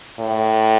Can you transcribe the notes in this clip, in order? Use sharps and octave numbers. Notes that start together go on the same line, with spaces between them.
A2